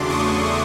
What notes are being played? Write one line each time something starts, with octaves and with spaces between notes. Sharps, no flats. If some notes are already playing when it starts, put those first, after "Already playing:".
Already playing: E2 C#3 F#3 A3 D4 C6 D6
C#6 D#6